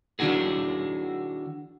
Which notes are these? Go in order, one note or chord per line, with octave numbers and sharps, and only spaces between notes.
D#3 D4 E4 F#4 G#4